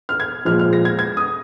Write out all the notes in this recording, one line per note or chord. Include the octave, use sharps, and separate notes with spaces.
F6
G#6
A#2 F3 G#3 F6
F6
A#6
G#6
G#6
D#6